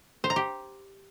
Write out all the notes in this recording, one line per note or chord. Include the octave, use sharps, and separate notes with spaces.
C5
A#5
G4